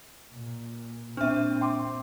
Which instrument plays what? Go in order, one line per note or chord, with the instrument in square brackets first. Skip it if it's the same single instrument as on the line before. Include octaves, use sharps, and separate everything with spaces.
[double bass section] A#2
[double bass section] A#2 C4 [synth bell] D4 E5 [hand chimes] F6
[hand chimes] G5 C6 D6